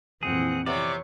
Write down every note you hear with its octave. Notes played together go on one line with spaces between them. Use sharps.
F2 A#2 E3 C4 G#4 F#5
C3 B3 C#5 D5